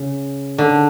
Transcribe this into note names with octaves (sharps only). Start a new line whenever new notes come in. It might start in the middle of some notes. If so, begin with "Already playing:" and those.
Already playing: C#3
D3